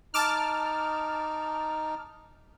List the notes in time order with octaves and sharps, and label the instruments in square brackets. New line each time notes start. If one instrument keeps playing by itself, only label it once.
[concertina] D#4 [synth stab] A5 D6 F6